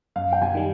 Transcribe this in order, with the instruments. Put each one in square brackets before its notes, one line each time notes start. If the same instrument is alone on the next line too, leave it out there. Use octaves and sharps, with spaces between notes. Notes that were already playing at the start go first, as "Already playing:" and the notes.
[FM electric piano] F#2 [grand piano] F5
[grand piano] G5
G#5
[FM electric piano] D#3 G3